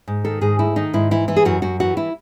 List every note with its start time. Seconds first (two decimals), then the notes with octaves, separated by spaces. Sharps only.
0.08 G#2
0.25 D#3 A4
0.41 G#2 G#4
0.59 A3 E4
0.76 D#3 D#4
0.94 G#2 E4
1.11 E3 E4
1.28 E3 E4
1.37 G#4
1.45 F#2 F#4
1.62 F#2 F#4
1.80 E3 F#4
1.97 E4